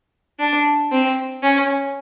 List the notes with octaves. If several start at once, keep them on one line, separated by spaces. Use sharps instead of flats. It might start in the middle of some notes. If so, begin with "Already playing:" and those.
D4
C4
C#4